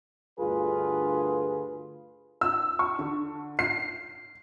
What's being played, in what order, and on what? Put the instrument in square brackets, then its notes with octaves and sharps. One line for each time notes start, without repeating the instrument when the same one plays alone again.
[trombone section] D2 G2 D3 F4 G#4 B4
[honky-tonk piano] E6
C#6
D3
C7